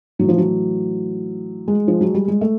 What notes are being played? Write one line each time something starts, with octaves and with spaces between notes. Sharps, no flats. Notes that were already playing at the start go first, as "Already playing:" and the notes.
A2 E3 F#3
F3
F#3
G#3
F3
F#3
G3
G#3
A3